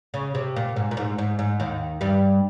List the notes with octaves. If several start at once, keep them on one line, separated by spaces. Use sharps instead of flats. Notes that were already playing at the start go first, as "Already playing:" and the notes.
C#3
C3
A#2
G#2
A#2
G#2
G#2
G#2
D#2 D#3
G2 G3